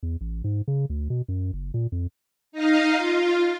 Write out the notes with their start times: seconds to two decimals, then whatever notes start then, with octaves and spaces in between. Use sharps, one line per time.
0.03 E2
0.21 A1
0.44 G#2
0.68 C#3
0.90 D2
1.10 B2
1.28 F#2
1.53 F#1
1.74 A#2
1.92 F2
2.52 D#4 D#5 F5
2.96 F4